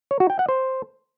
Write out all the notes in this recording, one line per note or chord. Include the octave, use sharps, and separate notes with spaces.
C#5
F#4
G5
F#5
C5